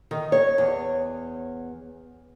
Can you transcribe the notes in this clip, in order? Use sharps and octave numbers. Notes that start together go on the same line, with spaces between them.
D#3
C#5
E2